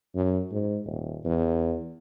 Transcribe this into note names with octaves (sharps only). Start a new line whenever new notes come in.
F#2
G#2
D#1
E2